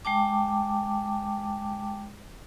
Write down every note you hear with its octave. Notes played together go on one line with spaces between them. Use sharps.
G#3 G5 A5 D6